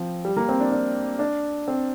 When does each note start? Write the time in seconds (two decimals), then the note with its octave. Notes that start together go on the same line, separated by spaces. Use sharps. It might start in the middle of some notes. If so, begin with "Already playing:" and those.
Already playing: F3 C4
0.25 G3
0.37 A#3
0.49 C4
0.60 D4
0.72 D4
1.19 D4
1.68 C4